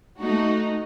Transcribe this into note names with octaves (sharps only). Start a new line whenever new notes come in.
A3 D#4 F#4